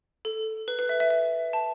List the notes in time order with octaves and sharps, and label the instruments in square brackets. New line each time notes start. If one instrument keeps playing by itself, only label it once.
[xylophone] A4
B4
B4
E5
E5
E5
A5